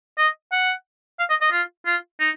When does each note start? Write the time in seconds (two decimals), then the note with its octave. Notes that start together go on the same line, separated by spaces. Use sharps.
0.18 D#5
0.52 F#5
1.19 F5
1.30 D#5
1.42 D#5
1.52 F4
1.86 F4
2.20 D#4